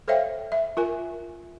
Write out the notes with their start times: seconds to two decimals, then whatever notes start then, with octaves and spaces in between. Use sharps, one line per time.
0.08 A4 C5 C#5 E5 F5 G5
0.52 E5
0.77 F4 A#4 G#5